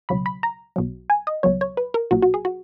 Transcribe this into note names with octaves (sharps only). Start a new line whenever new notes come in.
C#2 B2 F#3 B5
B5
A#5
B1 B2 F#3
G#5
D#5
C#2 B2 F#3 C#5
C#5
B4
A#4
B1 A#2 F#3 F#4
F#4
G#4
F#4